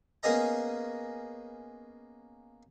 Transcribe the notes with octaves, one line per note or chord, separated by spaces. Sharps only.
A#3 B3 C#4 G#4 D#5 A#5